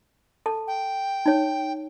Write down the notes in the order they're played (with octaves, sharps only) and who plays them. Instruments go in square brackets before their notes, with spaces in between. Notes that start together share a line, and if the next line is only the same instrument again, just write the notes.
[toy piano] A4 A5
[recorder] G5
[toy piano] D#4 C#5